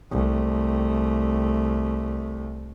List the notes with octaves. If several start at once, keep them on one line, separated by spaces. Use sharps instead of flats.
C2 A3